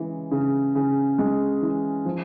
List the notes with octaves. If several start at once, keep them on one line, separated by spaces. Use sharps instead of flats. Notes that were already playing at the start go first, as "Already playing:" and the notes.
Already playing: C#3 E3 G#3
C#3
C#3
G#3
E3
F3